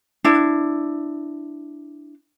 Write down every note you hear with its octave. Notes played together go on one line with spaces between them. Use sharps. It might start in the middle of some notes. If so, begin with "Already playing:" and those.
D4 E4